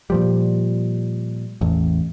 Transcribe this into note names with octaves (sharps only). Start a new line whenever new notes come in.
A#2 F3 G3
A1 E2